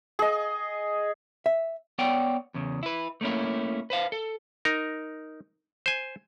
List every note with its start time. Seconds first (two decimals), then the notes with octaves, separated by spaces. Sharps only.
0.19 G#4 D#5
1.46 E5
1.98 B3 C#5 D5 F#5 G5
2.54 E2 C#3
2.83 E4 B4
3.21 A3 A#3 C#4 E4
3.90 B4 C5 F5
4.12 A4
4.65 D#4 A#4
5.86 C5 G#5